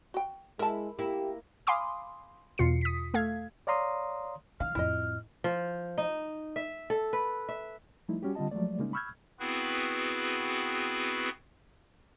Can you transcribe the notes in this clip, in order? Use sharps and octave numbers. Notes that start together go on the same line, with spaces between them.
F#4 G5
G#3 E4 A#4 A5
A#3 E4 G4
F5 G#5 B5 C6 D6 D#6
E2 B2 F4 C7 C#7
D#6 B6
A3 A4 F5 G#6
C#5 D5 F5 A#5 C6 D#6
E3 D#4 F5 F6
F2 A2 E4 D#5
F3
D#4
E5
A4
B4
E5
F3 G3 A3 D#4 E4
G3 C#4 F#4 G4
D3 G3 C4 F4 D#5 A5
F3 F#3 G#3 A3 D5
C#3 G3 G#3 A#3 C#4 D#4
B5 C#6 E6 F6 G6 G#6
B3 C4 E4 F#4 G#4 B4